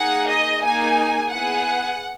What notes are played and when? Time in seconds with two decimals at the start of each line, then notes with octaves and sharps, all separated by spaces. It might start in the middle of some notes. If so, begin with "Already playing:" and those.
Already playing: A#3 D#4 G#4 F#5
0.26 D#5
0.61 A#3 D#4 G#4 G#5
1.30 B3 E4 G#4 F#5